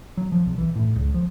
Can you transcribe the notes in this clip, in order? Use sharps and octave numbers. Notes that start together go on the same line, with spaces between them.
F#3
F3
B1
E3
A2
C#2
F3